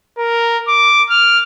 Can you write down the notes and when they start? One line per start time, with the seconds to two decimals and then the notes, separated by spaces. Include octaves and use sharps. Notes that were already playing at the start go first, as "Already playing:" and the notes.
0.18 A#4
0.68 D6
1.10 F6